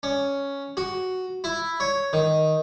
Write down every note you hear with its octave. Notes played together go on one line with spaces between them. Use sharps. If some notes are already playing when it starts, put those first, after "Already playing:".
C#4
F#4
E4
C#5
D#3